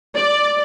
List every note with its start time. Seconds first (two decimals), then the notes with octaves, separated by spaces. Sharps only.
0.16 D5